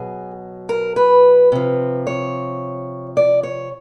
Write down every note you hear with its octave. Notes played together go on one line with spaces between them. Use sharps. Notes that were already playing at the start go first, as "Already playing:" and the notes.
Already playing: B2 F#3 G#4
A#4
B4
C3 F3
C#5
D5
C#5